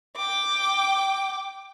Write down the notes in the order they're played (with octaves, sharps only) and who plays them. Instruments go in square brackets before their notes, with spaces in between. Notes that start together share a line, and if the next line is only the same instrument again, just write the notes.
[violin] G5 D6